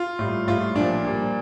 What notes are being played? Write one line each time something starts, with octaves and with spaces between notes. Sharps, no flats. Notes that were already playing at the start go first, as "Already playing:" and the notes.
Already playing: F4
A2 G3
A2 G3 F4
A#2 F3 D4
A#2 G3